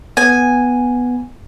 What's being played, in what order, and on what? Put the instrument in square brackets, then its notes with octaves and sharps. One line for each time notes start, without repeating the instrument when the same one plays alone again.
[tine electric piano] B3 [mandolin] G#5